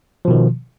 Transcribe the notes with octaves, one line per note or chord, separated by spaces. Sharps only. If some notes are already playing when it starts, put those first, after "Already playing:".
B2 D#3 F3